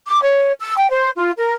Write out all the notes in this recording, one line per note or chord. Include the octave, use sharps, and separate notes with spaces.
D6
C#5
E6
G5
C5
F4
A#4